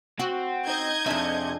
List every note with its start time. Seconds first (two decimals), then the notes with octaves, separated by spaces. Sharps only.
0.19 C4 F#4 F#5
0.67 D#4 D#5 G6 G#6
1.06 F2 C3 D4 G#4 E5